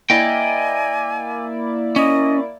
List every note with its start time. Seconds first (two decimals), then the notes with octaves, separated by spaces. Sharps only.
0.10 A#3 E4 D5 D#5 G5 G#5
1.96 C#4 D#5